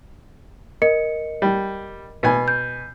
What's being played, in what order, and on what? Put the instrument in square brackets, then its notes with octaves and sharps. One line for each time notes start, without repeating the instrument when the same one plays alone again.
[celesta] A#4 D#5 C#7
[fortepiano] G3
B2 G#5
[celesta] G6